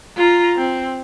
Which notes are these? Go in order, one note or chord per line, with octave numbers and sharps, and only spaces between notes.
F4 A#5
C4